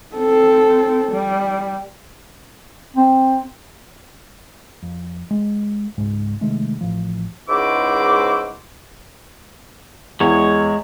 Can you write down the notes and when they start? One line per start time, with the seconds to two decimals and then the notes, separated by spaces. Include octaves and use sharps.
0.15 C4 A4
1.12 G3
2.96 C4
4.83 F2
5.31 G#3
5.98 C#2 G#2 G#3
6.41 C3 D#3 G#3 A3
6.81 A1 F3
7.49 C#2 G#2 E4 F#4 C5 D6
10.20 E2 G#3 C#5